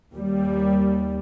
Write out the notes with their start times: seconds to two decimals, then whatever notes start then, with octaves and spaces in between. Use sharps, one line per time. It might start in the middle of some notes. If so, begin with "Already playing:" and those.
0.14 D#2 G3